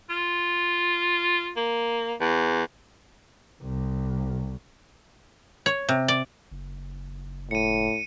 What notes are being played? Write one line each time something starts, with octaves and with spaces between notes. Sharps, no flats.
F4
A#3
E2
C2
C#5
C3
D5
F#1
A2 C#7 D#7